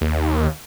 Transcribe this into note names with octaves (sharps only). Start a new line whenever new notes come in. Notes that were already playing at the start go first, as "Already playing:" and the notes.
D#2